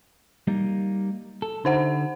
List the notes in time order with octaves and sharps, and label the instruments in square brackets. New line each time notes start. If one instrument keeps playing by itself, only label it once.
[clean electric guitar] G3 A#3 D#4
A4
[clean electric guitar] D3 [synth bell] D#4 C5 F#5